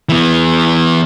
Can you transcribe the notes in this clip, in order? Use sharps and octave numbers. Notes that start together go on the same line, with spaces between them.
E3 B3